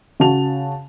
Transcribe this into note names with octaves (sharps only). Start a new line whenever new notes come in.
C#3 F#4 A5 F7